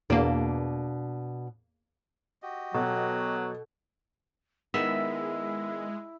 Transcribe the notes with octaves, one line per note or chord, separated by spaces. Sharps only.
E2 B2 A#3 D4
F#4 G4 D#5
B2 F#3 A4
D#3 G#3 B3 E4 E5